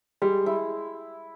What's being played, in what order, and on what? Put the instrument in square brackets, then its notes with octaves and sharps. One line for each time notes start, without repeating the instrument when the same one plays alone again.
[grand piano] G3 [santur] G#3
[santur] E4